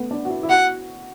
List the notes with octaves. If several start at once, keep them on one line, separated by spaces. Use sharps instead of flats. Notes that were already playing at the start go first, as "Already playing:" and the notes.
Already playing: A3 B3
D4
F#4
E4
E4
F#4 F#5